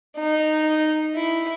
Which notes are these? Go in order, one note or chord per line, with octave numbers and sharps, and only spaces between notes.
D#4
E4